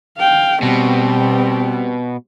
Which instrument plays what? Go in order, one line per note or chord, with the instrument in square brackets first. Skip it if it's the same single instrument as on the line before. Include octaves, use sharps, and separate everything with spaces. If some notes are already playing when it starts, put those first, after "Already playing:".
[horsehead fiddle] F5 G5
[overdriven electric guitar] B2 [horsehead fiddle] G3 C4